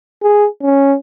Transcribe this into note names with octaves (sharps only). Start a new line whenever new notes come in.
G#4
C#4